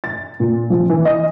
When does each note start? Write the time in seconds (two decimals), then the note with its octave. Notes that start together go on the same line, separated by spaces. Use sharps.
0.04 A6
0.40 A#2
0.70 F3
0.90 E3
1.05 D#5